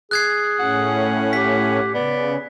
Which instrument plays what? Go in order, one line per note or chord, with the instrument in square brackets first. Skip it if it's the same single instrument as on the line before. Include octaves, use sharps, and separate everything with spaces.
[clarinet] G#4 [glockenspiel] F#6 G#6 C7
[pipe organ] A2 C#4 [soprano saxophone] F#5
[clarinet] G4 [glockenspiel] B6
[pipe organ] C#3 [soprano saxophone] B3 [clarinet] D5